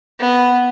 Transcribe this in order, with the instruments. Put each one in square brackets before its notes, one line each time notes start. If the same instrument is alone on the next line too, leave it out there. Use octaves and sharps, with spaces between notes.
[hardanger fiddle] B3